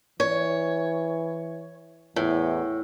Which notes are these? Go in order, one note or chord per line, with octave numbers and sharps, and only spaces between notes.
E3 C#5
E2 A2